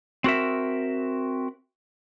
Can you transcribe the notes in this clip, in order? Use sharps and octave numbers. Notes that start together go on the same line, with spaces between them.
C4 F#4 A#4 E5